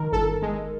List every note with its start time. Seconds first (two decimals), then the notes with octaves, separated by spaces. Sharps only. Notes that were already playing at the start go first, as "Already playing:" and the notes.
Already playing: D#3 A#4
0.12 G1 A4
0.42 G#3